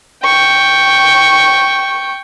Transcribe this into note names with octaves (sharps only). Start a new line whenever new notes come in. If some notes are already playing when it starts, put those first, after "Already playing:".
G5 C#6